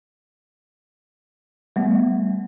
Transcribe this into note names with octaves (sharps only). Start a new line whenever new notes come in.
G3 A3 B3